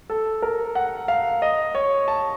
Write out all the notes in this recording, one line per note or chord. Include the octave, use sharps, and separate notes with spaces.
A4
A#4
F#5
F5
D#5
C#5
A5